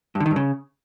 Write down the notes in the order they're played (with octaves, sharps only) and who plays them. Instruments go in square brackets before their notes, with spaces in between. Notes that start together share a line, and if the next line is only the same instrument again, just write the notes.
[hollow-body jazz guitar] G2
D3
D#3
G2
C#3